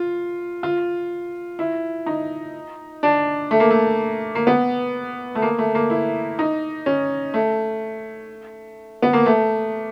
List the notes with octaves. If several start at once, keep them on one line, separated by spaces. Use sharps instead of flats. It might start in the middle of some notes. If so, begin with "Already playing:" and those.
Already playing: F4
F4
E4
D#4
D4
A3
A#3
A3
A#3
B3
A3
A#3
A3
A#3
E4
D#4
C#4
A3
B3
A#3
A3